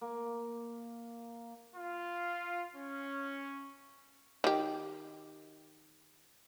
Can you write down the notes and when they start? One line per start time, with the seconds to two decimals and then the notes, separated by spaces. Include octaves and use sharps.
0.01 A#3
1.76 F4
2.75 C#4
4.44 D#3 G4